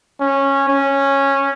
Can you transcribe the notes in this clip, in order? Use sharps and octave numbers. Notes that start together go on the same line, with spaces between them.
C#4
C#4